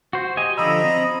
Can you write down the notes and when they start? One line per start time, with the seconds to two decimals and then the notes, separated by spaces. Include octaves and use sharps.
0.13 F#4 C5
0.37 G4 D#5 G#5
0.58 D3 F3 D#5 A#5 B5 E6
0.84 C4